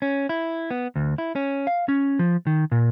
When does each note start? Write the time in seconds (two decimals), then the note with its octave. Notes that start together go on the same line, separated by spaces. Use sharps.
0.02 C#4
0.29 E4
0.71 B3
0.96 D2
1.18 E4
1.36 C#4
1.67 F5
1.89 C#4
2.19 F3
2.47 D#3
2.72 A#2